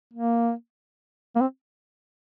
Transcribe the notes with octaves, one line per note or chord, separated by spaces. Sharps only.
A#3
A#3
C4